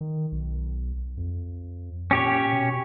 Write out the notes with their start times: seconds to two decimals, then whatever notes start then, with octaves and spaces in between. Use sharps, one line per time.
0.01 D#3
0.32 B1
1.17 F2
2.11 A#2 C#4 G4 C#5
2.53 B2